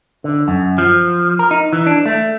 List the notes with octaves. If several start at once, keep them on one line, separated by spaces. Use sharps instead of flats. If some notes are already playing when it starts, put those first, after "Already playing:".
D3
F#2
F3
A#4
D#4
E3
D4
A3